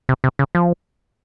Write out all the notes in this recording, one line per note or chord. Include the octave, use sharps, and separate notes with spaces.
C3
C3
C#3
F3